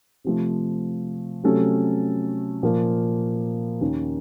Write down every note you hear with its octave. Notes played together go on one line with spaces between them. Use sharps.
C3 F3 A3
C3 F#3 A3 C#4 A4
A#2 F3 A#3
D#2 D#3 A#3 C#4